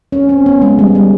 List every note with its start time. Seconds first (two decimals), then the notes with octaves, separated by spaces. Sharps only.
0.12 C#4
0.29 C4
0.46 B3
0.62 G#3
0.79 G3
0.95 G3